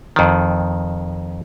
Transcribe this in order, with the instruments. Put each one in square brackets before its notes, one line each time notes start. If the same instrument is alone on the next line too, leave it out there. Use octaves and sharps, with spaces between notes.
[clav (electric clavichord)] F2 D#3